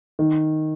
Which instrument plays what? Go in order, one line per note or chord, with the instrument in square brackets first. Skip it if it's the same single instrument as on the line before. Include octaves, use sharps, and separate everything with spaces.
[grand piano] D#3